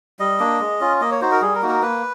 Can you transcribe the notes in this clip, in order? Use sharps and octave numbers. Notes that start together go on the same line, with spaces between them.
G3 D#5
A#3 D4
G#3
C#4 F4
A#3 D#5
C#5
D#4 F#4 C5
A#4
G3 G#4
A#4
A#3 D#4 F#4
A#4
A#3 B4